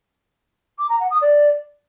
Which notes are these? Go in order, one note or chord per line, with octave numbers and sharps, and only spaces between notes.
D6
A#5
F#5
D#6
D5